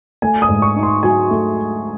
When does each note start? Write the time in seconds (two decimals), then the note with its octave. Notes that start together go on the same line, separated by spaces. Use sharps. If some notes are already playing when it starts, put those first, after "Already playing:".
0.22 A3 G#5
0.42 D#6
0.49 G#2
0.62 C#6
0.76 D#4
0.83 C6
1.03 F#3 G#5
1.31 A3